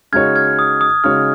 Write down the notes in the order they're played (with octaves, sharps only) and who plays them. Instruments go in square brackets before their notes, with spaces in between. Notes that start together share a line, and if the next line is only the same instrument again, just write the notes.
[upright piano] C#3 G#3 D#4 F#4 C#5 [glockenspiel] F6 G#6
[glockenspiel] F6 G#6
D#6
D#6
[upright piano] C#3 G#3 D#4 F#4 C#5 [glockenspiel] F6